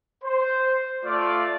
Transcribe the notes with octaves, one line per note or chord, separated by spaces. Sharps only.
C5
A3 F4 D5